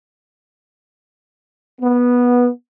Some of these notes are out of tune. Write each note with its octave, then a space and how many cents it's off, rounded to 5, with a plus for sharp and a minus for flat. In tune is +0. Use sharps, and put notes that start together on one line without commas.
B3 -15